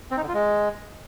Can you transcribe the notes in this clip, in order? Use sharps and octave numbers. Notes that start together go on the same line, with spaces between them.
C4
D#4
D3
F4
G#3